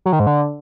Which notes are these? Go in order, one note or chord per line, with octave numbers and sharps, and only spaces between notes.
F#3
D#3
G#2
D3